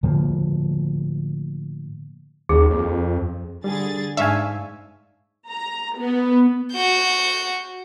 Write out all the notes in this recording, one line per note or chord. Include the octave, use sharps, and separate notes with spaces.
A2 D3 F3 A#3
D#2 G#4
F2
D3 G3 G#4 A6
G#2 D4 E5 F5 G#5 C#6 E6
A#5
B3
F#4 G6